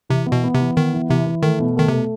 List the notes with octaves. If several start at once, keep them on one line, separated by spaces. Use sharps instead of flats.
C3 E3
B3
B2
B3
C3
E3
D#3 B3
E3
C3 E3
E3
D#3 A3
B2
D#3 A3
C3 A3